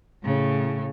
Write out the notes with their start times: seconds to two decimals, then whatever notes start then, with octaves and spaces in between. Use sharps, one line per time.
0.23 A2 C#3